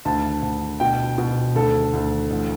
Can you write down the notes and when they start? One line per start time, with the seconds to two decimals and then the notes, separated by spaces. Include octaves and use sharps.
0.05 D2 A5
0.43 D2
0.80 B2 G5
1.18 B2
1.55 D2 A4
1.93 D2
2.30 A1